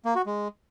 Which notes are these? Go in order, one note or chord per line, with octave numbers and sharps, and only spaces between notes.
A#3
F#4
G#3